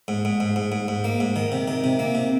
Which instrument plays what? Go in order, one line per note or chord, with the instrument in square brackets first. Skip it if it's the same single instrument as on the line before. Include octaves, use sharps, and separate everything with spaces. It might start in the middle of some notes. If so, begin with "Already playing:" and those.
[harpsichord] G#2
G#2
G#2
G#2
G#2
G#2
A#3
G#2
D#3
C3
D#3
C3
A#3
C3